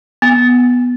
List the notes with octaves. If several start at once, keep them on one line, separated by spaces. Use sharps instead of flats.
B3